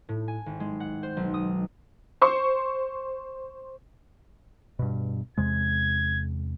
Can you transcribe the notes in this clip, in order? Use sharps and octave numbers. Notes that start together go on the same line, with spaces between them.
A2
G#5
G#1
G#3
F#5
C5
B1
D#6
C5 C6 C#6
G2 B2
E2 C3 G#3 G#6